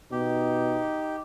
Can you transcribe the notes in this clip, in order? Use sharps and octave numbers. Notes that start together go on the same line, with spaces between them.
B2 D#4 G4